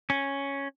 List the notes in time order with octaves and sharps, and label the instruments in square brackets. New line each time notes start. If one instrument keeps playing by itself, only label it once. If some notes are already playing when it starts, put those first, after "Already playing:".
[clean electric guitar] C#4